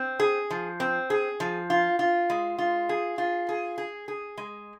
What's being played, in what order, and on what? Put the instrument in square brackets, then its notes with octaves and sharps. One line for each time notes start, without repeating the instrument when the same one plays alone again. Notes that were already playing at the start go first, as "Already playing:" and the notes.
Already playing: [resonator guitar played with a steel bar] C4
G#4
F3
C4
G#4
F3
F4
F4
G#3
F4
G#4
F4
G#4
G#4
G#4
G#3